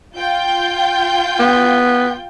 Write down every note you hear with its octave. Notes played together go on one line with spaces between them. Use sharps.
F4 G5 G6
B3